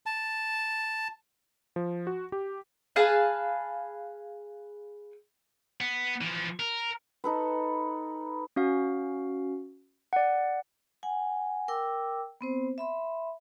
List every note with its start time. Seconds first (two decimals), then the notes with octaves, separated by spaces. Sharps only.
0.06 A5
1.76 F3
2.07 F#4
2.32 G4
2.96 G#4 B4 F5 A5
5.81 B3
6.21 E3 F3
6.59 A#4
7.24 D#4 A4 B4
8.56 C#4 F#4 F5
10.13 D5 F#5
11.03 F#5 G#5
11.68 A#4 G5 D6 E6
12.41 B3 C4 C5
12.78 E5 B5 C6